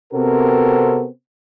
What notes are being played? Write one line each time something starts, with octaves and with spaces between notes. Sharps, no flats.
C3 B3 C4 F#4 A4 A#4